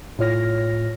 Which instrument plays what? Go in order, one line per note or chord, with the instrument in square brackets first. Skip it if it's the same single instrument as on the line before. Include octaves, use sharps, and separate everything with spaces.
[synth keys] A2 F4 C#5 F6 A#6